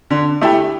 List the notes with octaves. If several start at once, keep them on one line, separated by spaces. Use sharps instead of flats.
D3
A3 E4 G4